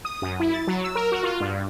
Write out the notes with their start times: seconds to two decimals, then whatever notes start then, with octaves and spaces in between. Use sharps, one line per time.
0.05 D#6
0.22 F#2
0.40 E4
0.53 A6
0.67 F#3
0.84 E6
0.95 A#4
1.12 F#4
1.23 F4
1.40 G2